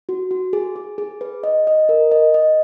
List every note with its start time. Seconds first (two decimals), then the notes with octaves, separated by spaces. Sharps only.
0.09 F#4
0.31 F#4
0.53 G#4
0.76 G#4
0.98 G#4
1.21 B4
1.44 D#5
1.67 D#5
1.89 A#4
2.11 D#5
2.34 D#5